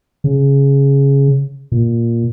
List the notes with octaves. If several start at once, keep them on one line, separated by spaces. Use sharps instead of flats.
C#3
A#2